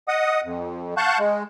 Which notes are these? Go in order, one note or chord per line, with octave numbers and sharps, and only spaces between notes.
D#5 F#5 D#6
F2
F5 F#5 A5 C#6 F#6 G6
G#3